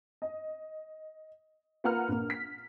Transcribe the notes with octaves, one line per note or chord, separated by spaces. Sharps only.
D#5
A#3 F4 B4 F#5 A#5 F6
A#1 A#3
B6